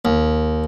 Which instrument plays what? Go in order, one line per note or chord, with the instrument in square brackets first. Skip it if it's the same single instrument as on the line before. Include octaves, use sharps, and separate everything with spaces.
[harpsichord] D#2